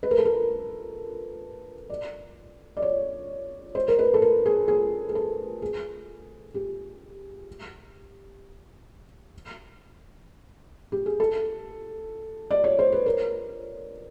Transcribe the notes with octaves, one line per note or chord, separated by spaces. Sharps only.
B4
A#4
A4
A#4
D5
D5
C#5
C5
A#4
B4
A4
A#4
G#4
G#4
G#4
A4
G#4
G4
G4
G#4
A4
D5
C#5
C5
B4
A#4